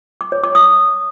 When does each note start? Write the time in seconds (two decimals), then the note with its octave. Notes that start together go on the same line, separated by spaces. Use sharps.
0.21 D6
0.32 C#5
0.44 D6
0.55 D#6